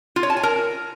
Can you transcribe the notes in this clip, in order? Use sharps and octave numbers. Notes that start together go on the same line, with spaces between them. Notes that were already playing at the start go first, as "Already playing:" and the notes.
F4
C#5
A5
G#5
A#4